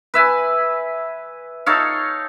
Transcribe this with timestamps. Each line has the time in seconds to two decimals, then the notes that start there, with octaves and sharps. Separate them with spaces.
0.14 B4 E5 G#5
1.66 D#4 A4 C#5 F5